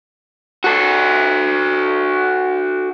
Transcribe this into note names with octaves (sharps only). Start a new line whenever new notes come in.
F#4 A4